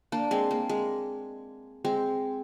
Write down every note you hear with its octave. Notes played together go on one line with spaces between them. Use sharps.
A#3 D4
G#3 C4
A#3
G#3
G#3 C4